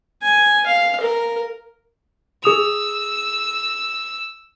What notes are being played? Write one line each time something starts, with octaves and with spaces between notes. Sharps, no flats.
G#5
F5
A#4
G#4 D#6 E6 F7